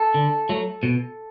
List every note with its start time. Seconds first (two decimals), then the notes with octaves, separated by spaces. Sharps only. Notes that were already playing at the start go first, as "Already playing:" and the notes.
Already playing: A4
0.14 D3
0.49 F#3 A3
0.83 B2